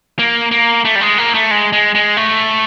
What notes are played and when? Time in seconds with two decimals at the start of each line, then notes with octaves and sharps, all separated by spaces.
0.19 A#3
0.51 A#3
0.85 A3
0.96 G3
1.01 G#3
1.18 A#3
1.34 A3
1.51 G#3
1.73 G#3
1.95 G#3
2.17 A3